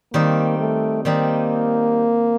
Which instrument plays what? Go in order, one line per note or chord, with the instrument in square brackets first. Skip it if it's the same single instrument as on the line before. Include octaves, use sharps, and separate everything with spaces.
[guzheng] D#3 G3 C4 D#4 [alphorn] A#3
[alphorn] A3
[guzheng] D#3 G3 C4 D#4 [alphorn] A#3